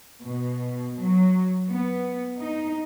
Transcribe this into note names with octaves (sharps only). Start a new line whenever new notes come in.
B2
F#3
B3
D#4